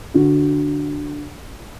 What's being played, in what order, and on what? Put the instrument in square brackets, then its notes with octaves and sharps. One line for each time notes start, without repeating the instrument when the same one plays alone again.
[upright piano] D3 F#4